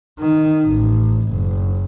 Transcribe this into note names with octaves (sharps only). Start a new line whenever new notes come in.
D#3
A1
F#1